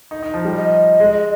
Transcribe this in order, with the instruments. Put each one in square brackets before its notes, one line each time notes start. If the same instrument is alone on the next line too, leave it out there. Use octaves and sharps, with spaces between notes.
[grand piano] D#4
D#4
F3
G3
[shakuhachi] D#5
[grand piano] G#3